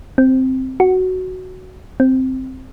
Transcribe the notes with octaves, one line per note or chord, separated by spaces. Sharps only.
C4
F#4
C4